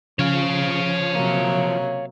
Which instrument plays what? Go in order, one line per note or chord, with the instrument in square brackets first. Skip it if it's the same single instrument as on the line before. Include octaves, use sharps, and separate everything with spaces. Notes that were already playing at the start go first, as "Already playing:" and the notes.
[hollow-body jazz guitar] C#3 [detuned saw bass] F3 [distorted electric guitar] C#5 F5
[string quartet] C3 F#3 A#3